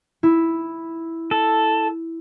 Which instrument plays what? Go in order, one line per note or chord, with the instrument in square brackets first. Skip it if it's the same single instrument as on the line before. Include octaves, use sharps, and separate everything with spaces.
[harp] E4
[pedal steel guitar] A4